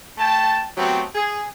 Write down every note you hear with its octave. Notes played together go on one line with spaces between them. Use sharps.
A3 G5 A5
F#3 A3 B3 C4 G4
G#4